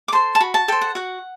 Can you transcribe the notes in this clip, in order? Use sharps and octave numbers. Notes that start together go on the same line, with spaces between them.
D6
A4 C5 C6
A5
F#4 B5
A5
A4 C5 G5
F#5
F#4 F#5